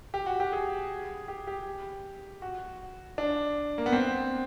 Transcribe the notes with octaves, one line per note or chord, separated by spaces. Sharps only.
G4
F#4
G4
G#4
G4
G4
F#4
D4
A#3
B3
C4